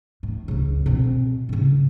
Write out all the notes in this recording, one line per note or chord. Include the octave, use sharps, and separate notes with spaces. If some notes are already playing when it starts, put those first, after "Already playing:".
A2
C#2 C#3
B2 C4
A2 C#3